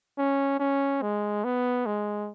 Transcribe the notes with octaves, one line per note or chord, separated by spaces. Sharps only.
C#4
C#4
G#3
B3
G#3